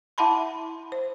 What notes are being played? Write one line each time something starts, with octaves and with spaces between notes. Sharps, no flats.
E4 E5 F#5 A5 B5 C6
C5